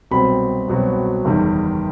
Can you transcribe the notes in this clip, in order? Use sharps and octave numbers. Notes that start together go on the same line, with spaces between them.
C2 B2 F#3 C4 B5
C2 B2 F#3 C4
F#1 E2 D#3 G3